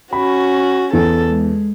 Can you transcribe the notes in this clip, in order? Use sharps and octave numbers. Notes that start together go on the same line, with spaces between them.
C#4 F#4 B5
E2 A4
G#3